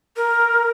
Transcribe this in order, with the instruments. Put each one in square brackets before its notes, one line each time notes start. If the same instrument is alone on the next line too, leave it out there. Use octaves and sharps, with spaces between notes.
[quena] A#4